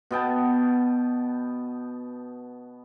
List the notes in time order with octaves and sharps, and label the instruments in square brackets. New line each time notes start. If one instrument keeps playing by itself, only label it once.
[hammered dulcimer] B2 B3 G5 A5